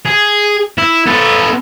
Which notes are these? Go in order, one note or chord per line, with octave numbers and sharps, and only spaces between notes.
G#4
E4
B3 A4